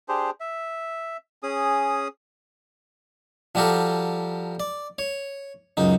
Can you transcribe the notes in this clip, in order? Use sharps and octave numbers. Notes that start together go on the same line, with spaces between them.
D4 G4 G#4 C5
E5
C#4 G#4 D#6
F3 G3 F#4 G4 A4 A#4
D5
C#5
C#2 F#2 D#4